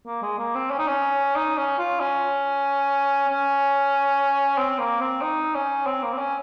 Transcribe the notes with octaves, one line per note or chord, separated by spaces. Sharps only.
A#3
G#3
A#3
C4
C#4
D#4
C#4
D#4
C#4
F4
C#4
C#4
C4
A#3
C4
D#4
C#4
C4
A#3
C4
C#4